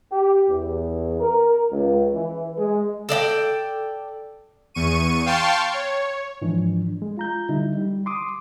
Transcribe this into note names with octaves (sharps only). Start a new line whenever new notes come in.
G4
E2
A#4
C#2
E3
G#3
A4 D5 D#5 G5
E2 C#6 D#7
F5 G5 A5 C6 C#6
C#5
G#2 E3 F3 D4
G#3
F4 A#5 G6
D3 G3 D#4 E4
G3
C6 D6 D#6